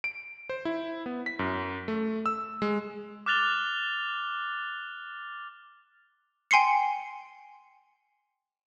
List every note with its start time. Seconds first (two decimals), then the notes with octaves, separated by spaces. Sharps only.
0.04 D7
0.49 C5
0.65 E4
1.06 B3
1.26 B6
1.39 F#2
1.88 A3
2.26 E6
2.62 G#3
3.26 D6 F6 F#6 A6 F7 G7
6.51 G5 G#5 C6 C7 C#7